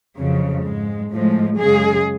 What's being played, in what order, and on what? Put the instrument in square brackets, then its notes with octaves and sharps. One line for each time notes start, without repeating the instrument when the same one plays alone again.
[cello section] F2 C#3 F#3
G#2 G#3
A2 F3 G#3
F#2 C#3 G#3 G#4